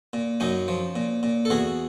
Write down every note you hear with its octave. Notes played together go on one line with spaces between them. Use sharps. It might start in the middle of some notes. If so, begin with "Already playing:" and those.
A#2
F#2 C#4 D#4
F3
A#2
A#2
A4
E2 F#4 G#4